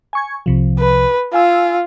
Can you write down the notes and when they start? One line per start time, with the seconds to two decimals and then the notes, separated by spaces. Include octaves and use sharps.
0.13 G#5 C#6 G#6
0.46 C2 C3 F3
0.79 B4
1.33 F4 F5 G#5 E6